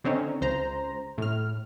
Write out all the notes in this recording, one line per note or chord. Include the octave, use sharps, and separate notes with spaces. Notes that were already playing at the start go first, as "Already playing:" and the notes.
D3 C4 C#4 D#4
C#2 C5 A#5
A2 F6